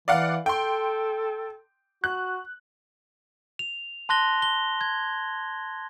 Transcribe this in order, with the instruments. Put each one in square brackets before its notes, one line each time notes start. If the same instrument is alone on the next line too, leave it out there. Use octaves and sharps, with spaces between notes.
[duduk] E3 [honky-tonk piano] D5 F5 F#5
[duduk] A4 [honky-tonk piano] G5 C6
[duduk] F#4 [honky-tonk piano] F#6
[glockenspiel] F7
A5 C6 F#6 A#6 G7
G7
G#6